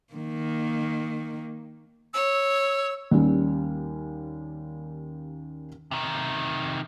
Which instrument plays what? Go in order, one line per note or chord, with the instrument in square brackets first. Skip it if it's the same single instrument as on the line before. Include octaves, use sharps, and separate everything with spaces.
[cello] D#3 A#3
[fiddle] C#5 [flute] E6
[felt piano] D#2 G3 C#4
[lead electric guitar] C3 D#3